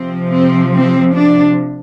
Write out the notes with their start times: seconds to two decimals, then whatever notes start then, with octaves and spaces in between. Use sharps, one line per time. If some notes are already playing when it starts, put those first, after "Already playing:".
Already playing: C3 F3 C4
0.31 C4
0.72 C4
1.13 D4